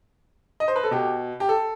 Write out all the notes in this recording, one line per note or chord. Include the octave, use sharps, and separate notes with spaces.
D#5
C5
B4
A4
B2 G4
G4
A4